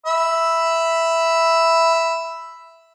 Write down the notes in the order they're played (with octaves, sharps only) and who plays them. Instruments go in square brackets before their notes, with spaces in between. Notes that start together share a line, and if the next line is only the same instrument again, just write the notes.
[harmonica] E5 B5